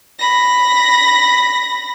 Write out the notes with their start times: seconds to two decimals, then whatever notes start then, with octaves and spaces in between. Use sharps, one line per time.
0.19 B5 A#6